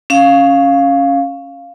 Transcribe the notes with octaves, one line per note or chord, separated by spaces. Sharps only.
C#4 F5